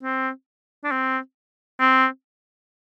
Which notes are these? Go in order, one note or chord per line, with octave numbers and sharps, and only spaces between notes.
C4
D4
C4
C4